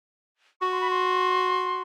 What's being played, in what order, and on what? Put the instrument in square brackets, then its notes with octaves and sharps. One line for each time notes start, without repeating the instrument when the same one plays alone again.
[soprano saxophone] F#4 [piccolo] C#6
[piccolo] C6
B5
C6